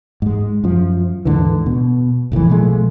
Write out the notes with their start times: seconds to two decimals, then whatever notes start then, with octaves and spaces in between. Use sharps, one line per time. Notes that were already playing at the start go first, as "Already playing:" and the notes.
0.22 G#2 G#3
0.64 F#2 F3
1.25 D#2 G#2 D3 E3
1.66 B2
2.32 F1 B1 A2 E3
2.50 B2 F3 G#3 A3